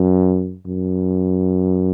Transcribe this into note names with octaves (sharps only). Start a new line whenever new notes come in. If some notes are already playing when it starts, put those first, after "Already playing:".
Already playing: F#2
F#2